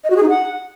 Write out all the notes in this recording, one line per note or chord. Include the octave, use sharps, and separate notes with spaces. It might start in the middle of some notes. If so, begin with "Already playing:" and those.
D#5
F#4
G#4
D#4
F#5